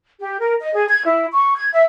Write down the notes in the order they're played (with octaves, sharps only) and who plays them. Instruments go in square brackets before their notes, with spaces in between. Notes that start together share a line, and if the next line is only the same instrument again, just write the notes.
[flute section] G4
A#4
D#5
G#4
G#6
E4
C#6
G#6
E5